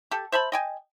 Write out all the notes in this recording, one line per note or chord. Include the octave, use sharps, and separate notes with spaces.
G4 A4
C5 E5 A5 B5
D#5 G5 G#5